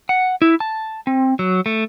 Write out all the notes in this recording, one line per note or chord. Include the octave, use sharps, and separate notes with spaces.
F#5
E4
A5
C4
F#3
A3